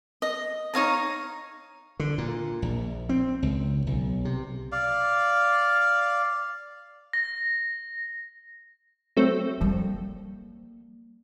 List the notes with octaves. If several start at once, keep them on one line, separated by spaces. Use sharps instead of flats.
D#5
D#4 C#5 F5 A#5
D3
A#2
A#1
C4
C#2
B1
C3
D5 F5
A#6
F#3 A3 C4
F2 G3 A#3